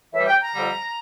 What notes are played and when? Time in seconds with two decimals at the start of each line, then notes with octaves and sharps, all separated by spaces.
0.13 A2 E3 G3 E5
0.27 G5
0.40 A#5
0.54 F2 D3 G3